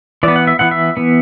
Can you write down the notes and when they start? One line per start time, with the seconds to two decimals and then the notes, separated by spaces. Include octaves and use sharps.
0.23 E3 B3 D5
0.36 F#5
0.47 E5
0.59 E3 B3 F#5
0.71 E5
0.97 E3 B3